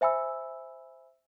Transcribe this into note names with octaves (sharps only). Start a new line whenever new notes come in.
C5 E5 G#5 B5 E6